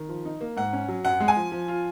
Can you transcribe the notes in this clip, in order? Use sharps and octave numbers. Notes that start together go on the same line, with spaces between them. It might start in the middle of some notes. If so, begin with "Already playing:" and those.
Already playing: D#3
F3
D#4
A#3
G#2 F#5
C#4
F#3
F#2 F#5
G#3
G#5
F3
F3
F4